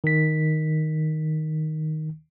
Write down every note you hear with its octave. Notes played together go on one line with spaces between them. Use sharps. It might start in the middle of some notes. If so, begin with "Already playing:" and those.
D#3 B6